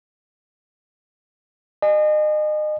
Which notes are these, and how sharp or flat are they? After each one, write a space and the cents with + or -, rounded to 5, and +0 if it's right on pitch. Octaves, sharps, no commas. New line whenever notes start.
D#5 -35 G#5 +0